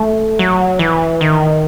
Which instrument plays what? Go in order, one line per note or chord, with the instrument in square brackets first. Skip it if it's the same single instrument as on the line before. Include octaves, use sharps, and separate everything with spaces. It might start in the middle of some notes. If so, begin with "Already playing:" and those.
Already playing: [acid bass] A3
F#3
E3
D#3